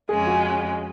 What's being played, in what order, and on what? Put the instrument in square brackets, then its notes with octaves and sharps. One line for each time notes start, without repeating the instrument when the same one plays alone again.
[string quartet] F2 C#3 G#3 C#4 [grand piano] G#4
[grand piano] F#4